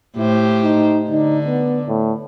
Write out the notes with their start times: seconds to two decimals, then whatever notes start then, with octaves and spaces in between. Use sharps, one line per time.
0.17 A2 E4 G4 C5
0.63 D#4
1.10 D3 D#4
1.47 B3
1.87 A2